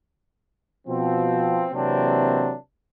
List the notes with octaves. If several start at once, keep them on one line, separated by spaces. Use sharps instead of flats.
B2 F3 C4
C3 E3 F#3 A#3 C4 D4